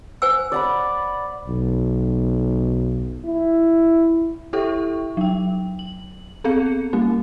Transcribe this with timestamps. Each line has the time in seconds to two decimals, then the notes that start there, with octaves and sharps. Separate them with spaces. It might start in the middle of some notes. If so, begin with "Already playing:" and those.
0.22 C5 G#5 E6
0.52 D5 F#5 B5
1.48 B1
3.26 E4
4.53 E4 G4 A4 E5 G5 C#6
5.17 F#3 G5
5.79 F#7
6.44 B3 C4 G#4 A4 F5 C#7
6.66 C#7
6.93 G3 A#3 C#4